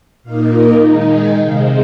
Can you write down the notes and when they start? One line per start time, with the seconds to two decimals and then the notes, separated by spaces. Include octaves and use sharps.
0.23 A#2 A#3 D#4 F5
0.53 A#5
0.83 D#3 G#3 D#4
1.13 G#5
1.43 C3 G#3 C4 F5